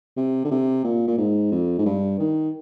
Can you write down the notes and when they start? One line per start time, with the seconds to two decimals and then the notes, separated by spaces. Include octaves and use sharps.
0.17 C3
0.45 D3
0.51 C3
0.84 A#2
1.08 A#2
1.18 G#2
1.52 F2
1.79 G#2
1.86 G2
2.19 D#3